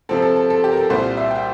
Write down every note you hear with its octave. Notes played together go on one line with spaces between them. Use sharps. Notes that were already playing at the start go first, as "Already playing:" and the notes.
C3 F3 C4 A4
A4
A4
A4
G4
A#4
A4
C2 A#2 G3 C5
E5
G5